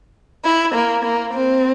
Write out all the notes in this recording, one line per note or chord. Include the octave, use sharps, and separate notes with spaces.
E4
A#3
A#3
C4